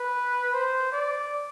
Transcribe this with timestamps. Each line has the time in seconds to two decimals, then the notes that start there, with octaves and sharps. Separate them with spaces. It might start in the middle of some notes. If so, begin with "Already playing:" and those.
Already playing: B4
0.54 C5
0.92 D5